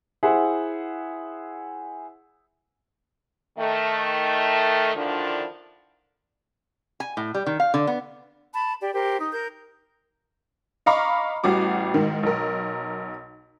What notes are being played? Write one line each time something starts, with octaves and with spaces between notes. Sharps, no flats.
E4 G#4 C5 E5 F#5
D#3 A3
D3 D#3 F3 D4 E4 F4
G#5
A2
G3
D#3
F5
D3
B3
A5 B5
G4 D5
G4 A#4 C5
D#4
A#4 G6
D#5 F5 A#5 B5 C#6 D6
A1 G3 F#4 D6
G#2 D#3
B1 A#4